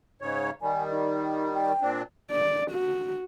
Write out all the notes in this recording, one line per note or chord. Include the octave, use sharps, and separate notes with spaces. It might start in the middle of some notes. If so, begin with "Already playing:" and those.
G#2 C#3 C#5
D#3 G3 G#5
D#4
G5
A#2 C4 D4
D5
F#4